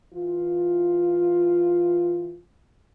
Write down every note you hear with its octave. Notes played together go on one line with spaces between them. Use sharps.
E3 F4